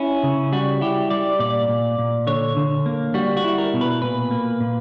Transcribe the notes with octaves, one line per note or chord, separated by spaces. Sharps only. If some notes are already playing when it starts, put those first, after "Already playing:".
Already playing: C#4 E4
C#3
G3 F#4
E4 G4
G3 D5
A#2 D5
A#2
A#2
D3 C#5
D3
A#3
G3 F#4
F#4
E4
A#4
B2
B4
A#2 B4
A#3
A#2